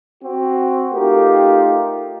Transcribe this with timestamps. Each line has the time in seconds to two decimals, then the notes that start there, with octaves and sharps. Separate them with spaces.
0.24 C4 F#4
0.93 A3 D#4 F4 G4 A#4